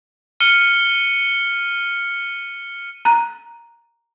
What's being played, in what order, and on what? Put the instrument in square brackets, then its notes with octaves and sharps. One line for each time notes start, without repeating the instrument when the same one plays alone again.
[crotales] F6 C#7 D#7 G7
[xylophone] A#5 F#6